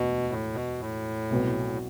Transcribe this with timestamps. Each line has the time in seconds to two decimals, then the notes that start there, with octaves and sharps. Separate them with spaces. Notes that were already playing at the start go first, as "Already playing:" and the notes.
Already playing: E1 D2 B2 F#3
0.30 A2
0.54 B2
0.80 A2
1.30 C2 B2 F#3 B3